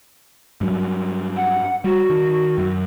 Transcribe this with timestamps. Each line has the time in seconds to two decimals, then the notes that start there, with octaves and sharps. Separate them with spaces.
0.61 G2 F#3
1.36 F#5
1.84 G3 F#4
2.10 D#3
2.58 F#2